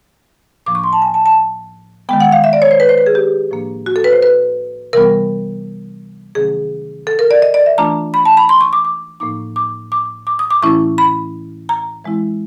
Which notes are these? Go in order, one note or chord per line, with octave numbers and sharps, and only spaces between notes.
A2 F3 A#3 D4 D6
C#6
C6
A5
G#5
A5
A5
D#3 G#3 B3 G5
F#5
F5
E5
D5
C#5
C5
B4
C5
B4
G#4
G4
A2 F3 A#3 D4
F#4
A4
B4
C5
B4
C3 E3 G3 B3 A#4
C3 D#3 F#3 A3 C#4 G#4
A4
A#4
D5
D#5
D5
E5
E3 A3 D4 F4 A#5
B5
A5
B5
C6
C#6
D6
D6
A2 F3 A#3 D#4 D6
D6
D6
D6
D#6
D6
A2 E3 A3 C#4 E4 C#6
B5
A#5
E3 G#3 C4 E4